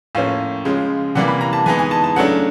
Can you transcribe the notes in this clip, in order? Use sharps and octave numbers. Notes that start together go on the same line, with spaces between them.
A2 F3 A#3 C#4 F5
C#3 F3 G#3
C3 E3 G3 A#3 F#5
B5
A#5
A5
E3 G#3 B3 D#4 G#5
G#5
A5
A5
C#3 F#3 A3 D4 F#5